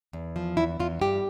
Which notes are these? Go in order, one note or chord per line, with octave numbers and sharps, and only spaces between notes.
E2
F3
E2 E4
E2 F4
G2 G4